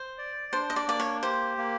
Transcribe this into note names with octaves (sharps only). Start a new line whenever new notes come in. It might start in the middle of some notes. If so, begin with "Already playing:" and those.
Already playing: C5
D5
D4 C5
D#5
D5
A#3 D5
C#5
G4 C5
A#3